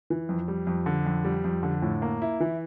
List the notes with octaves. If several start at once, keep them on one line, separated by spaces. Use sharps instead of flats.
E3
F2
G3
F2
D3
F2
G3
F2
D3
A2
A#3
E4
E3